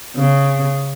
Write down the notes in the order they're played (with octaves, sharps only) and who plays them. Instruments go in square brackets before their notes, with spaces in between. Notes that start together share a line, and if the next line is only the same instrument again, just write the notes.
[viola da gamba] C#3